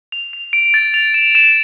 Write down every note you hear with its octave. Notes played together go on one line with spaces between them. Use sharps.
F7
F7
D7
A6
F7
E7
E7